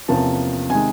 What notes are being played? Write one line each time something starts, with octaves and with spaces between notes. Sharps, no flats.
E2 C3 F3 A#3 C#4 A5
C3 D#3 G#3 G#5